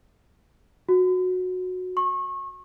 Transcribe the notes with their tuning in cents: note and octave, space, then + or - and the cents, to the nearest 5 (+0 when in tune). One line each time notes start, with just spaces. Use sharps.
F#4 -15
C#6 -30